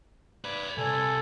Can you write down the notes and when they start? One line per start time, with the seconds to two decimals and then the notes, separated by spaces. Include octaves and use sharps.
0.45 B4 D5 B5
0.78 C2 A4 G#5